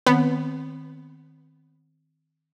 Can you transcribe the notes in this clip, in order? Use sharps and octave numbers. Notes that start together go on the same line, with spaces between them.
D#3 B3 C4